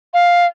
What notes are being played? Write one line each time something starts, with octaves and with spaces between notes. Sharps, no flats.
F5